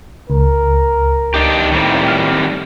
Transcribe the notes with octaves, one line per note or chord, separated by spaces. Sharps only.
C#2 A#4
D4 D#4 G4
A2 D#3 G3 C4
F6